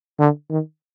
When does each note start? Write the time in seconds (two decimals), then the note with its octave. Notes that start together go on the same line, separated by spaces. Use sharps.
0.19 D3
0.50 D#3